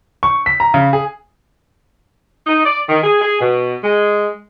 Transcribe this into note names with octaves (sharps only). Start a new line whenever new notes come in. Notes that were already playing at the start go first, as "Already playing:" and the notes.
C#6
B6
A#5
C#3
G#4
D#4
D5
D#3
G#4
G#4
B2
G#3